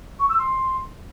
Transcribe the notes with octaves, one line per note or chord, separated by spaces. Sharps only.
C#6
E6
C6